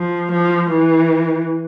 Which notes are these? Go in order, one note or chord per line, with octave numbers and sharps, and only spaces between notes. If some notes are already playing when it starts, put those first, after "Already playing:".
Already playing: F3
F3
E3